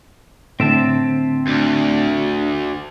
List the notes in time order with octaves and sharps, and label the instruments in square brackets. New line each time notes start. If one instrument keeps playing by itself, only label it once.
[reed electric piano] A2 D3 [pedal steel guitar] C4 E5 A5
[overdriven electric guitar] D2